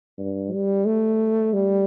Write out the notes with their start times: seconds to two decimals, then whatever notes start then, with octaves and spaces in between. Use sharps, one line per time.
0.18 G2
0.52 G3
0.86 A3
1.53 G3